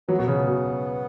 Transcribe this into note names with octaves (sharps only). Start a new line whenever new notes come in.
F#3 B3
B2
C#3
B2